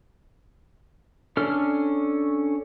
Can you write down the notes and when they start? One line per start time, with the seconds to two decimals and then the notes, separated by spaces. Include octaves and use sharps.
1.37 C#4 D4 A4 F6